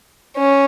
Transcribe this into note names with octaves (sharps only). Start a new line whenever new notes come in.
C#4